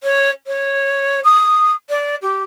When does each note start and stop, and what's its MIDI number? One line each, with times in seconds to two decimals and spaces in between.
0.03 0.30 73
0.47 1.20 73
1.24 1.72 87
1.89 2.15 74
2.22 2.43 67